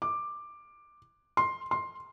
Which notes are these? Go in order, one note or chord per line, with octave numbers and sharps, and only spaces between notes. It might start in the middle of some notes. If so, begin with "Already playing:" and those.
D6
C6
C6